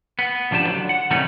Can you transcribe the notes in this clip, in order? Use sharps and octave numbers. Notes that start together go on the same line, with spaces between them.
B3
C#2 F3 D4 G4 A5
D3 F#3
F#5
C3 D#3 E3 G3 A3 C#4